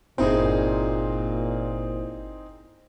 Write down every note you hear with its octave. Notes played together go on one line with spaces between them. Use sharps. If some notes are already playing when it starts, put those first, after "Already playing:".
G1 A#2 C4 D#4 E4 G#4 C5